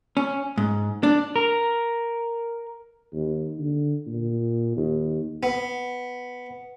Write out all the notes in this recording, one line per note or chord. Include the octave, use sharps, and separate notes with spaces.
C#4
G#2
D4
A#4
D#2
D3
A#2
D#2
B3